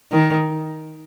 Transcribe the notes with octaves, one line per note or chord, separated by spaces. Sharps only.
D#3